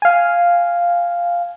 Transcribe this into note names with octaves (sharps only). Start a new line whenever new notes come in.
F5 G#5